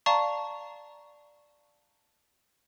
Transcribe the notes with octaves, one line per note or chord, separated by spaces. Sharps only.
D5 F5 A5 A#5 C#6